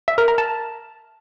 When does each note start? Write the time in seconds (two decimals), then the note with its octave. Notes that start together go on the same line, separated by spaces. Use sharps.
0.08 E5
0.18 A#4
0.28 A#5
0.38 A5